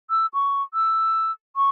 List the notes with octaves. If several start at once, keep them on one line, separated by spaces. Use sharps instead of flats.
E6
C#6
E6
C#6